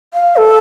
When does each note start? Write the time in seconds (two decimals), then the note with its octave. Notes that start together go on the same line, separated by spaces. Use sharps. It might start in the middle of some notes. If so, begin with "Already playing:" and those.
0.14 F5
0.37 A4